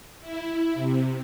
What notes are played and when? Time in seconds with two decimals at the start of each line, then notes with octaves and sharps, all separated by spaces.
0.22 E4
0.75 C3